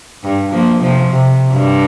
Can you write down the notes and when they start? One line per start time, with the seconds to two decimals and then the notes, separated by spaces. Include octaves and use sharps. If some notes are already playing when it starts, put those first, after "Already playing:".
0.23 G2
0.52 F3 A#3
0.80 C3 F3
1.09 C3
1.52 G2